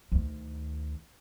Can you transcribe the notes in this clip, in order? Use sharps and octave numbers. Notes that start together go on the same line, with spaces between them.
D2 D#3